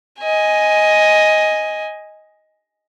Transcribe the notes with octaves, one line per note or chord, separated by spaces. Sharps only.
D#5 G#5